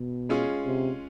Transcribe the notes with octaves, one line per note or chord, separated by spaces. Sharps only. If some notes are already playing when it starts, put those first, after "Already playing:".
Already playing: B2
G#3 C#4 F4 G#4
C3